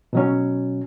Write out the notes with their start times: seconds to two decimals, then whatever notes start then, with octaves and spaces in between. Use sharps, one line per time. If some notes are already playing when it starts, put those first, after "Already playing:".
0.13 B2 F#3 C#4